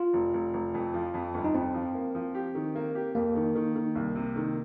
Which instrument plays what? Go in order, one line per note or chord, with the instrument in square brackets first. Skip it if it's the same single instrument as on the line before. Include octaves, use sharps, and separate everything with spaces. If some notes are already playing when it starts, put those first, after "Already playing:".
Already playing: [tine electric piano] F4
[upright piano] F1
F1
F1
F2
F3
F2
G1
[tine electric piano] D#4
[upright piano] F2 [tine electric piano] C4
[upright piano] F3
A#3
F3
G4
D#3
A#3
G4
[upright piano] F2 [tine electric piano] A#3
[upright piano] D#3
D#3
D#3
C2
C3
D#3